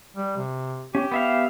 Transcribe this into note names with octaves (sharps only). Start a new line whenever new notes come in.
G3
C3
C#4 G4
B3 E5 F5